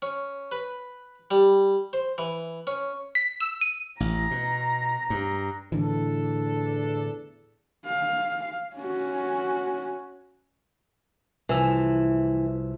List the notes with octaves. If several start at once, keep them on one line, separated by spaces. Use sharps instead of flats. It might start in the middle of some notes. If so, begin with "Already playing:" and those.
C#4
B4
G3
C5
E3
C#4
B6
E6
D#7
A1 A#5
B2
G2
E2 A2 D3 E3 D4 A4
F5
C#4 F#4
C2 E3 F3 E6